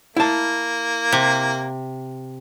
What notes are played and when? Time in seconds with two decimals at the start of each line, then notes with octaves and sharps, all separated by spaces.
0.16 A#3 E4 A5
1.12 C3